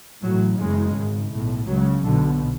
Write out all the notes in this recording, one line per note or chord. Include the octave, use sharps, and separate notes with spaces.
A1 A2 F#3
F#1 E2 C#3 G#3
G#1 G#2
B1 A2
C#2 C#3 F#3
B1 B2 D3